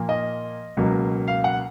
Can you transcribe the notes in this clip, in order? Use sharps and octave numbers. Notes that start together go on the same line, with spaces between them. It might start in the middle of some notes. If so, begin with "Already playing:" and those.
Already playing: A#2 F3 A#3
D#5
C#2 B2 F#3 A#3
F5
F#5